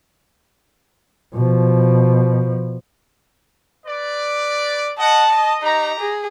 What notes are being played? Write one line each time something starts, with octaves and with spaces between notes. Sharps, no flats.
B2 F3
B4 D5
D#5 F#5 A5
D#5
D#4 G4 A#5
G#4